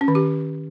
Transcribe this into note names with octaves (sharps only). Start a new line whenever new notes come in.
C#4
D#3
G4